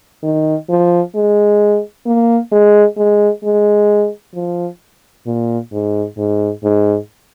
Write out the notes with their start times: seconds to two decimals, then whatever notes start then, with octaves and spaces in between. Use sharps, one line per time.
0.23 D#3
0.69 F3
1.15 G#3
2.06 A#3
2.52 G#3
2.97 G#3
3.44 G#3
4.35 F3
5.27 A#2
5.72 G#2
6.18 G#2
6.64 G#2